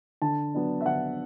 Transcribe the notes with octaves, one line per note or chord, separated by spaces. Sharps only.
D3 A5
F#3 B3 D4
E5
D3 F#5